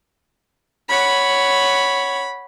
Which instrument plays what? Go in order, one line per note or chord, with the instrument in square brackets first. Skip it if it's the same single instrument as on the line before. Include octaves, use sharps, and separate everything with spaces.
[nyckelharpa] C#5 F#5 [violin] B5